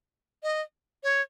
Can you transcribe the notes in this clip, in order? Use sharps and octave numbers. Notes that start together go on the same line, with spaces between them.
D#5
C#5